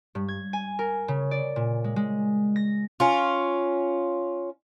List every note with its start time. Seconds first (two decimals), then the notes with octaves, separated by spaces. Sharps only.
0.15 G2
0.28 G#6
0.53 G#5
0.79 A#4
1.08 C#3
1.31 D5
1.56 A#2
1.84 G#3
1.96 G#3
2.56 A#6
3.00 C#4 F4